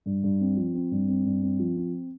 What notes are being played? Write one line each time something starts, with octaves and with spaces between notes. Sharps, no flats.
G2
G2
C4
F3
C4
G2
C4
G2
C4
F3
C4